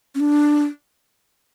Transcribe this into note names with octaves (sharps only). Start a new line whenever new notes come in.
C#4
D4